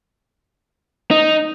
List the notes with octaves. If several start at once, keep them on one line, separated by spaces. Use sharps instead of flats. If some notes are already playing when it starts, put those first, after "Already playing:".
D#4